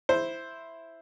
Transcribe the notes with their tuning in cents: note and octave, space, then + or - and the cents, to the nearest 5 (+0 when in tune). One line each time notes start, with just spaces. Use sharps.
E4 +0 C5 +0